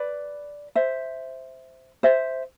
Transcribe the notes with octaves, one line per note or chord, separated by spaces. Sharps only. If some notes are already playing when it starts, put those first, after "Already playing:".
Already playing: B4 D5
C5 E5
C5 E5